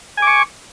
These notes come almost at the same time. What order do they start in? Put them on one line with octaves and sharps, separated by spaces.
G#5 D6 C#6